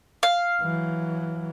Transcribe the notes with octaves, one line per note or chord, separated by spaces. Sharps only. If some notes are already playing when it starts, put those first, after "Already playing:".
F5
E3 F#3